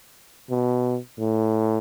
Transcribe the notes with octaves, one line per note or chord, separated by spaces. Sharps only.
B2
A2